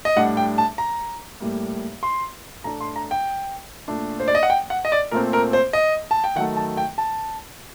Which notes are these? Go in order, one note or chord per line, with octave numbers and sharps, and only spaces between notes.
D#5
A2 G3 D4 F#5
G5
A5
A#5
A2 G3 A#3
C6
A2 A3 D4 A#5
C6
A#5
G5
A#2 A3 D4
C5
D5
D#5
F#5
G5
F#5
D#5
D5
A#2 A3 C4 A#4
A#4
C5
D#5
A5
G5
D#3 F#3 A3 F#5
A5
G5
A5